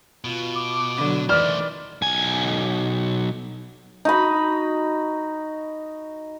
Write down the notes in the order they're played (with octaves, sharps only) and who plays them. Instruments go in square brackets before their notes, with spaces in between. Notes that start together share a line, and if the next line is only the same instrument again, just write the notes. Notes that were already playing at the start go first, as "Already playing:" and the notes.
[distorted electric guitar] B2 [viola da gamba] F4
[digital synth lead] D6
[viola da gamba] D3 F#3
[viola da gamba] D#3 E3 [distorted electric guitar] A3 C5 [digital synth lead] D5 [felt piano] F6
[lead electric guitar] B1 G#5
[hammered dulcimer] D#4 F#4 B5